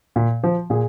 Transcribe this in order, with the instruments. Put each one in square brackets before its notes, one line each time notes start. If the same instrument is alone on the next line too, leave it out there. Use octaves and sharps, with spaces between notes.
[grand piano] A#2
F3
A#2 G#4